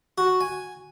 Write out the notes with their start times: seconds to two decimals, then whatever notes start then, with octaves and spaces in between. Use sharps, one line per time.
0.18 F#4
0.41 G#5